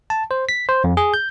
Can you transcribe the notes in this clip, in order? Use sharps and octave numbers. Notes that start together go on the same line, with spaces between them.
A5
C5
B6
C5
F2
G#4
G6